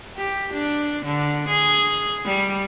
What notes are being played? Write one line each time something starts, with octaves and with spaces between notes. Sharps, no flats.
G4
D4
D3
G#4
G3